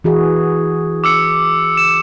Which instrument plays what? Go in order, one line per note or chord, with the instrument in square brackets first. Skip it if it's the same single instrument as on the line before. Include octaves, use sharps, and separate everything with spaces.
[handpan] E3 F#4 G#4
[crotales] D6 E6 C#7
E7